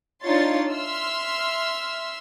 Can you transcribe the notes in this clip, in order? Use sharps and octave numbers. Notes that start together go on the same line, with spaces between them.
D4 D#4 F4 C#5 C6 A6
E5 C6 E6 F6